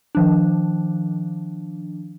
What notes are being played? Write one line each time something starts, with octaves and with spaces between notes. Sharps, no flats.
D#3 F3 D4